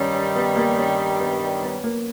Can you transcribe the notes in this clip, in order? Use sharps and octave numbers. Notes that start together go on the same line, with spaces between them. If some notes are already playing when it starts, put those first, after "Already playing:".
Already playing: G2 D#3 G3 C#4
C#4
B3
A#3
C#4
B3
B3
A#3